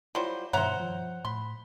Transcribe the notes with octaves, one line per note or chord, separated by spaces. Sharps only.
F#3 G3 E4 F4 C5
G2 B2 D#3 C5 C#5 E5 F#5 A#5
F3
A2 B5 C6